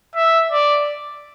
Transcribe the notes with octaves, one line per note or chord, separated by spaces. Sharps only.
E5
D5